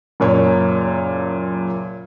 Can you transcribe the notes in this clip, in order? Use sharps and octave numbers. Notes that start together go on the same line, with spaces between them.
F#1 A#2 C#5